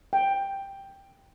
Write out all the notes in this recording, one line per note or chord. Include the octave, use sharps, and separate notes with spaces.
G5